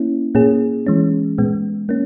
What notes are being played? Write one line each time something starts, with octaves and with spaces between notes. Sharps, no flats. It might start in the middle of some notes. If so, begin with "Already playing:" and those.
Already playing: A#3 C#4 E4
A#2 A#3 C#4 G#4
E3 G#3 C#4
A#2 G#3 B3
A#3 C#4